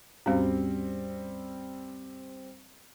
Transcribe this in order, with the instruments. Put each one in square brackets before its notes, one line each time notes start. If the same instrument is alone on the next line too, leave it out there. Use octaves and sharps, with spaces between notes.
[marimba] D#2 G#2 [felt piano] G3 C4